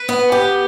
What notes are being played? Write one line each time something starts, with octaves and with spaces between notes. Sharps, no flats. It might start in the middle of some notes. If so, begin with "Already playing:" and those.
Already playing: B4
B3
G4